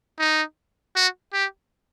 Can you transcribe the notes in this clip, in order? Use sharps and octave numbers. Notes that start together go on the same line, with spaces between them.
D#4
F#4
G4